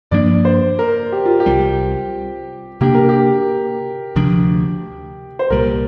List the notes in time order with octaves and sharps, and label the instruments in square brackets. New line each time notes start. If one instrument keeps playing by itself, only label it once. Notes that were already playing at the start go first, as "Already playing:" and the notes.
[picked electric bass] G2 F3 A#3 D4 [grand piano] D5
[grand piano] C5
A#4
G4
F4
G4
[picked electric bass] C2 C3 G3 C4
[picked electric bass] C3 A#3 D4 [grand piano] G4
[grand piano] A#4
G4
[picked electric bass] D2 C3 F3 D4
[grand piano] C5
[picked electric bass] C2 A#2 G3 [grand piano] A#4